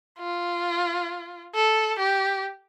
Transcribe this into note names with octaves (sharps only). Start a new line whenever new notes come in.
F4
A4
G4